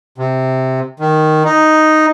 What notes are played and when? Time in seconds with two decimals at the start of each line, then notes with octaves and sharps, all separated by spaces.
0.18 C3
1.00 D#3
1.45 D#4